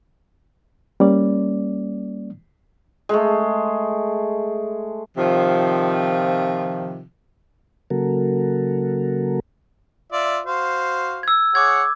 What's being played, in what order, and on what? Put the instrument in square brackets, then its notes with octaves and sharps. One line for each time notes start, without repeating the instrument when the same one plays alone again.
[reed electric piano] G3 A#3 C#4 D5
[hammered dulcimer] G#3 A3
[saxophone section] C3 D#3 F3
[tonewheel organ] C#3 F#3 A#3 F#4 A4 A#4
[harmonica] F4 D5 E5
F#4 C5 F5
[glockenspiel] E6 G#6
[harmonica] G#4 C#5 F#5 [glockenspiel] D6 G#6